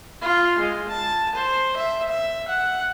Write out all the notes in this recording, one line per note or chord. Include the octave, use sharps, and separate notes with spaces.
F4
G#3
A5
C5
E5
E5
F#5